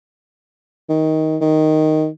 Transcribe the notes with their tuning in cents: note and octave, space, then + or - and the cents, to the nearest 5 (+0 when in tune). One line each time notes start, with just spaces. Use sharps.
D#3 +15
D#3 +0